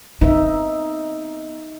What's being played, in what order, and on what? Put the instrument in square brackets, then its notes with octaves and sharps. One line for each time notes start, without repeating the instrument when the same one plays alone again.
[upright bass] B3 C4 [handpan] D#4 E5